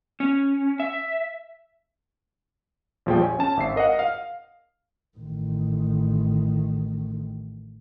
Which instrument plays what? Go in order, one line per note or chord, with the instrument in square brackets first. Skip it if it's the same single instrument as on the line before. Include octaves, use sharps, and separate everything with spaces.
[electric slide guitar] C#4
E5
[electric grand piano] A#1 E2 F3 G3 G#4 G5
C#5 G#5
C#4 A5 E7
G#1 E5 C7
A#4 D#5 F5 F#5
F5
[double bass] A1 D#3